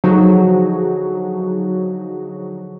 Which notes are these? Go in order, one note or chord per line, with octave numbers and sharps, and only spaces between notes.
D3 F3 F#3 D#4 F#4 G#4